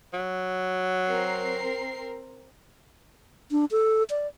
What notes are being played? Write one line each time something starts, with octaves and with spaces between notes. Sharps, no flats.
F#3
C4 A#4 C7
D4
A4
D5